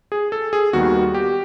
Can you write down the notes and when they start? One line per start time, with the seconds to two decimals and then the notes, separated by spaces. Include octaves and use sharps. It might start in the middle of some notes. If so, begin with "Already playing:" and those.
0.12 G#4
0.32 A4
0.53 G#4
0.73 D#2 D#3 G3 B3 F#4
1.14 G4